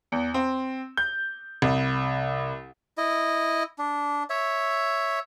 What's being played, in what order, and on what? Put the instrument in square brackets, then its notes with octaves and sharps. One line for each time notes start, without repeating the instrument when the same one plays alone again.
[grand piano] E2
C4
G6
C2
[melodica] E4 D#5
D4
C#5 E5